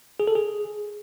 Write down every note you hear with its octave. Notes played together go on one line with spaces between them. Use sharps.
G#4
A4
G#4